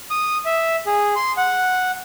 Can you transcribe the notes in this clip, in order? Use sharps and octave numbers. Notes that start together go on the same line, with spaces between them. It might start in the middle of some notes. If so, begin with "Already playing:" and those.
D#6
E5
G#4
C6
F#5